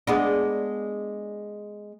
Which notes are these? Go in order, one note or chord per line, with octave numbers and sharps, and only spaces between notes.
G#3 B3 D4